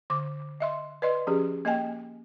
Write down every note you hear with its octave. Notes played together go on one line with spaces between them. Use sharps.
D3 D6
D#5 E5 C6
B4 D5 D#5 C6
F3 C#4 G4 G#4
A#3 D#5 G5 G#5